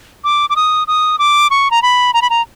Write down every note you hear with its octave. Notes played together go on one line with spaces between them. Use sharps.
D6
D6
D#6
D#6
D6
C#6
A#5
B5
A#5
B5
A#5